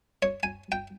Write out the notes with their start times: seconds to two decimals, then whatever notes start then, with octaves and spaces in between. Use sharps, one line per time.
0.22 C#5
0.43 G#5
0.72 G5